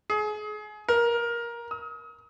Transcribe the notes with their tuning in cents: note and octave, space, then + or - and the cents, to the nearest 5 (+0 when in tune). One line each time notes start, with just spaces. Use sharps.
G#4 +30
A#4 +15
D#6 +40